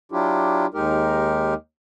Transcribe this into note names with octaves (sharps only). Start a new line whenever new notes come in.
F#3 D4 E4 F4 G4
D#2 G#3 D#4 G4 A#4